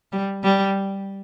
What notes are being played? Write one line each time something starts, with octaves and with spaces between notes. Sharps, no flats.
G3
G3